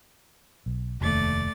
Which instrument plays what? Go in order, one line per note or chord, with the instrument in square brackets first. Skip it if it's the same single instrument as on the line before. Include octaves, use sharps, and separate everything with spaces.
[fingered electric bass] B1
[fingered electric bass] F1 D#2 [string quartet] A3 D5 A6